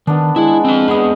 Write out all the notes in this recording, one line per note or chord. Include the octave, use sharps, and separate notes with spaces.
D#3 B3 D4
G#3 E4
C4 A5
B3 G#4 D#5 B5